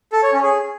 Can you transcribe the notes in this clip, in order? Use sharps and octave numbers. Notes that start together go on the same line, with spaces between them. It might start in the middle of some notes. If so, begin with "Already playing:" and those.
A4
C#5
C#4
G#4